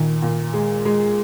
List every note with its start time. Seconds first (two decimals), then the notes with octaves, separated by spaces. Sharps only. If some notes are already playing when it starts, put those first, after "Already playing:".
Already playing: A#2 D#3
0.22 A#2
0.54 G#3
0.85 G#3